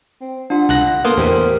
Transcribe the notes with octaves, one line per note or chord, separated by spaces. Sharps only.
C4
D4 F4 F#5
C2 F#6 A#6
A#3 B3 A4 C6 D#6
E2 A2 G4 A#4 C5